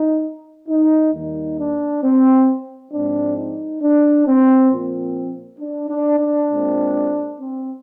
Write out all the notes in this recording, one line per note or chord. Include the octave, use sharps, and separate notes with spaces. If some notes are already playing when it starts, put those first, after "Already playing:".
Already playing: D#4
D#4
D#2 D#3 G3 A#3 D#4
D4
C4
G#2 F3 G#3 C4 D4
D#4
D4
C4
A#2 F3 C4
D4
D4
D4
A#2 G#3 C4
C4